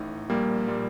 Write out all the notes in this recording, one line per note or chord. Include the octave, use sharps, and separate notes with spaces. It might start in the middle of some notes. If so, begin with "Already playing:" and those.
Already playing: A1 A2 D#4
A#1 G3 A#3
A#2 G3